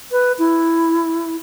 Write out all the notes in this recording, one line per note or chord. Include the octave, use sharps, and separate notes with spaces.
B4
E4